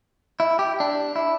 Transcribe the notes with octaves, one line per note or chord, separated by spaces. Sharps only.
E4
G4
D4
E4